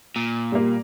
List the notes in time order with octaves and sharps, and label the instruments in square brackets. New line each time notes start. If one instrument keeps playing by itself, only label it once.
[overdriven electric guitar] A#2
[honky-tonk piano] G3 A#3